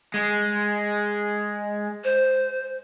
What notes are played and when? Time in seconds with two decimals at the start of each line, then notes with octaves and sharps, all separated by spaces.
0.14 G#3
2.04 C5